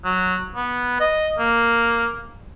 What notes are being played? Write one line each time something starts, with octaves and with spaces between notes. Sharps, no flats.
F#3
B3
D#5
A#3